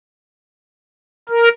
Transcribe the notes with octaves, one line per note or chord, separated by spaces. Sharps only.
A#4